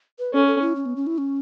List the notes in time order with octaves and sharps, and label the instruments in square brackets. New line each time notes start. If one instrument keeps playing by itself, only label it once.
[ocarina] B4
[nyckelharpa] C#4 [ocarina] A4
[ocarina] A4
E4
C#4
B3
C#4
E4
C#4